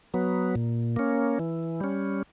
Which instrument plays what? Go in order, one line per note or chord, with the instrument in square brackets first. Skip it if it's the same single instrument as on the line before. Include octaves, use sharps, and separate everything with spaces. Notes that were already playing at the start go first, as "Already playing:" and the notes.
[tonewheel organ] F#3 B3
A#2
A#3 C#4
E3
G3 C#4